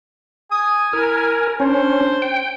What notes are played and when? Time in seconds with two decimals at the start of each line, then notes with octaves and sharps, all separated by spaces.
0.51 G#5 D#6
0.93 E4 A#4
1.60 C#4 D4 C5
2.22 G5